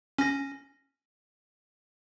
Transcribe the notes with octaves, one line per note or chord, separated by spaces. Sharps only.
C#4 A#6